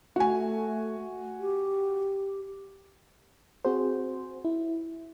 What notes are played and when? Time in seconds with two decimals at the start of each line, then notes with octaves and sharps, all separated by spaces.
0.16 A3 F#4 G#5
1.40 G4
3.65 C4 F#4 G#4 C5
4.45 E4